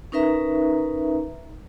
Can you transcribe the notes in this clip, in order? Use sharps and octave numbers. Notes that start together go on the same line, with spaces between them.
C#4 D#4 A#4 B4 E5 A#5